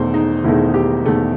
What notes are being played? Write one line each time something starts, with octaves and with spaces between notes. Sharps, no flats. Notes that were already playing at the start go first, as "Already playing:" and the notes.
Already playing: E1 E2 D#3 A3 C5
D#4
E1 E2 D#3 A3 E4
G4
E1 E2 D#3 A3